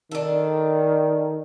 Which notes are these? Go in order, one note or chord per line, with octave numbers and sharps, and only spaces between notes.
D#3 D4 A4